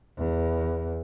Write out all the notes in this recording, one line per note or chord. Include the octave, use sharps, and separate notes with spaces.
E2